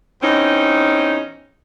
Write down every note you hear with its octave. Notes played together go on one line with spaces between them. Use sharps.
E2 C4 C#4 D#4